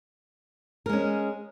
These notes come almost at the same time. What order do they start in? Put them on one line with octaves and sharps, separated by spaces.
A#4 G#3 C#4